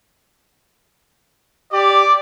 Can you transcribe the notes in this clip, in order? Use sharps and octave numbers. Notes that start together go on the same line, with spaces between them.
G4 D5